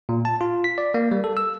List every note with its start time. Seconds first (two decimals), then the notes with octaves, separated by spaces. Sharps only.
0.09 A#2
0.25 A5
0.41 F4
0.64 B6
0.78 D5
0.94 A#3
1.12 G3
1.24 A4
1.37 E6